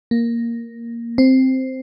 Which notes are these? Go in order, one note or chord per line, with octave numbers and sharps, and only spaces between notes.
A#3
C4